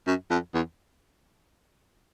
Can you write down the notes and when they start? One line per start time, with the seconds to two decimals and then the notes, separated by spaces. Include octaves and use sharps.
0.07 F#2
0.31 F2
0.54 E2